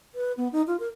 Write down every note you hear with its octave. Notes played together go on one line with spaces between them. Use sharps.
B4
B3
D#4
F4
A#4